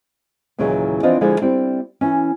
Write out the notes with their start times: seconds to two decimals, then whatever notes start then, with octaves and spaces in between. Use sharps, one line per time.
0.58 D#2 A#2 C#3 E3 F#3 A#3
1.03 E3 F3 C4 D4 F4 D#5
1.21 D3 F3 G#3 A#3 E4 F4
1.42 G3 C4 D4 E4
2.01 E3 C#4